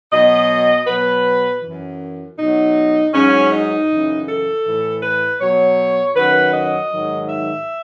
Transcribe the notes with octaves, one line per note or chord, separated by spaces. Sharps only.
B2 F#3 D#5
B2 F#3 B4
F#2 E3
B2 F#3 D#4
G#2 F#3 C#4
D#4
F#2 C#3 E3
A4
A2 E3
B4
B2 F#3 C#5
F#2 D#3 F#3 B4
D#5
G#2 D#3 F#3
E5